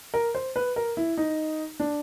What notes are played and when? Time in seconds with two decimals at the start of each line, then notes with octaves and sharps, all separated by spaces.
0.14 A#4
0.35 C5
0.56 B4
0.76 A#4
0.97 E4
1.18 D#4
1.80 D4